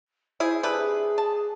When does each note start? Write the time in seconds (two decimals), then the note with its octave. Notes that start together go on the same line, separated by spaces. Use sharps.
0.40 E4 G#4 C5
0.63 C3 D4 G#4 B4
1.18 A5